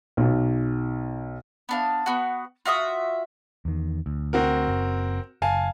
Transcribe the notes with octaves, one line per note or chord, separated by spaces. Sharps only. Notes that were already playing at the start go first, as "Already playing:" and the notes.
B1
B3 D4 F5
B3 F#4
F4 F#4 E5 D#6
E2 D#3
D2
C4 F#4 A#4
F#1
F#1 F5 G#5 A5